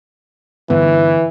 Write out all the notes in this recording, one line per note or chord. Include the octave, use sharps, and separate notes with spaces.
G2 D3 E3 B3